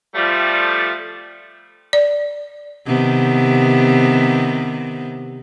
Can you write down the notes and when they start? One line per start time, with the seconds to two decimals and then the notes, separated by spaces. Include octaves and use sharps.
0.15 F3 G3 A3
1.93 D5
2.86 C3 D#3 B3